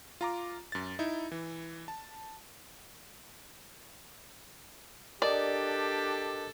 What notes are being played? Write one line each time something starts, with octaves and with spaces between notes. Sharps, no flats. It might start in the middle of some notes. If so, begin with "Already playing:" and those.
F4 A#5 D6
F#2 A6
D#4 E4
E3
A5
D4 G4 A4 A#4 D5 D#5